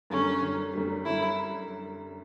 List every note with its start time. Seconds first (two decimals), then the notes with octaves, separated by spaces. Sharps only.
0.10 F#2 D3 G3 C#4
0.42 F#2 D3 G3
0.73 F#2 D3 G3
1.05 F#2 D3 G3 E4